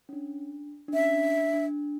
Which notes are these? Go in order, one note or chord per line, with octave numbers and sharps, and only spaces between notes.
C#4
D4
D4
C#4 E5
D4
D4
D4